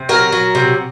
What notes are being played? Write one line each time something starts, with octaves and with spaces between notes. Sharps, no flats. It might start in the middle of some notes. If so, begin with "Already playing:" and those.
Already playing: C3
F#3 A#4
F#3
C3